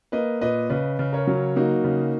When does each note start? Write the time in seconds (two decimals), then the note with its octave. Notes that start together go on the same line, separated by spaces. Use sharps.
0.12 A#3 B4 D#5
0.41 A#2 B4 D#5
0.70 C#3 B4 D#5
0.99 C#3
1.13 A#4 C#5
1.27 F#3
1.56 A#3 D#4 F#4
1.84 C#3